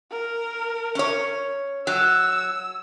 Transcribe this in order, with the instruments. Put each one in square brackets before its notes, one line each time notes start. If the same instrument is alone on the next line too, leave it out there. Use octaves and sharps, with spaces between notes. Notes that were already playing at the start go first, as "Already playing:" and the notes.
[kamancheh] A#4
[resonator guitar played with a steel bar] C#4 C#5
[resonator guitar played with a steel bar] F#3 [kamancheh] E6